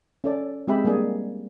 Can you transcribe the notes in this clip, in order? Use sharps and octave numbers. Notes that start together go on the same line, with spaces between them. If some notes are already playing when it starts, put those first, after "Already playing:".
C#4 A4 D5
G#3 C4 G4 G#4 E5 B5
G3 A#3 D4 G#4 D5